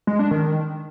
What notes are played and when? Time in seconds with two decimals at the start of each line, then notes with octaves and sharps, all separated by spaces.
0.07 G#3
0.19 D4
0.31 D#3